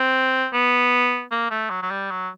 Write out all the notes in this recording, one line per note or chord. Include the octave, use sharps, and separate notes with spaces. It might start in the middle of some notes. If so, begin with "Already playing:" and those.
Already playing: C4
B3
A#3
A3
F#3
F#3
G3
F#3